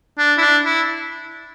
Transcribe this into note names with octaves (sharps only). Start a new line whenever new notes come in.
D4
E4
D4
E4